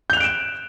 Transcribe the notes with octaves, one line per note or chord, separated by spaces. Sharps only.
F#6 G6 D7 E7 F7